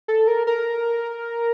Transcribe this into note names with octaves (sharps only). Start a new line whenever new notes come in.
A4
A#4
A#4